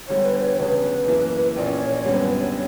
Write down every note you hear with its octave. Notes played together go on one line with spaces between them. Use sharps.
E2 D3 G3 C#5
B4
C#5
E1 D2 C#3 B4
F#2 E3 A#3
A#1 A#2 A#3 C#4 D5
C#5
C#5
F#2 D3 G3 B3 C#5
B4
C#5